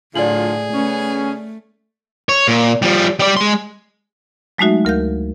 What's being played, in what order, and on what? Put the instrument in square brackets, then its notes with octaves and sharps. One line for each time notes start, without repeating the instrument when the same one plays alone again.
[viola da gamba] A2 [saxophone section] D3 F#3 F4 [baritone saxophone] G#4 [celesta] D5 F#7
[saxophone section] C#3 B3 C#4 [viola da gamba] A3
[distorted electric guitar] C#5
A#2
F3 G3
G3 D5
G#3 C6
[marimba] F#3 G#3 A3 D#4 F#4 E5
D2 A#4 F5 G6